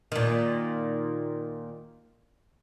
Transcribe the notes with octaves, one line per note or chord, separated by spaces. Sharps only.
A#2 D#3